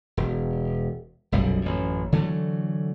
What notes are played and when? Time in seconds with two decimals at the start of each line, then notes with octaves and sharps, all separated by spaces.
0.17 E1
1.32 F1 B1 F#2 G3
1.62 A1 F#2
2.12 D3 E3 F#3 A3